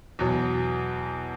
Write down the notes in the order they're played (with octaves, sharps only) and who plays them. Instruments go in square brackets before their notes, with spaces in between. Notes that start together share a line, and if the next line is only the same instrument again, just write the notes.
[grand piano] E2 B2 F#3 B3